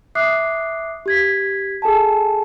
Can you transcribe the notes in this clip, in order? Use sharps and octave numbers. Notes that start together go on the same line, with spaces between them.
E5 D6 D#6 F#6 C7
G4 G#6 B6
G#4 A4 G#5 A5